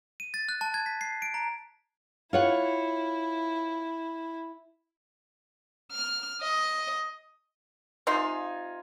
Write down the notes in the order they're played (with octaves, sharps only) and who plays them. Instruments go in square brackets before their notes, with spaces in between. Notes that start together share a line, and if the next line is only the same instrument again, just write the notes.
[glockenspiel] D#7
A6
F#6
A5
G#6
B6
C7
D7
A#5
[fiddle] E4 [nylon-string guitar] F4 C#5 F#5
[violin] F6
D#5
[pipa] C3 D#4 C6 [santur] F4 G#5